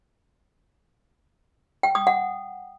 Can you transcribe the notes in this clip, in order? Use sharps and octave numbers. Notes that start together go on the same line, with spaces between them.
G5
D#6
F#5